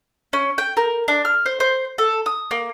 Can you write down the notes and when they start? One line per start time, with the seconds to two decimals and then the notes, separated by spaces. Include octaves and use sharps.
0.33 C#4
0.58 G5
0.77 A#4
1.08 D4
1.25 F6
1.46 C5
1.60 C5
1.98 A4
2.26 D#6
2.51 A#3